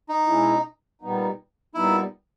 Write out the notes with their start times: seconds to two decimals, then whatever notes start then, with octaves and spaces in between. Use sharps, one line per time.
0.09 D#4
0.26 B2 G#3 C#4 E4
1.01 A#2 G3 B3 D#4
1.74 A#2 G3 B3 D#4 E4